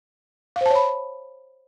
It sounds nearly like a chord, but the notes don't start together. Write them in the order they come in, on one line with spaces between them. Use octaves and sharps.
F5 C5 A5 C#5 B5